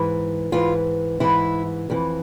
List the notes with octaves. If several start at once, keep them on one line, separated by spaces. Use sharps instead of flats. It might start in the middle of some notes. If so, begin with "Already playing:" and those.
Already playing: G#2 E3
G#2 E3 F4
G#2 E3 E4
F2 E3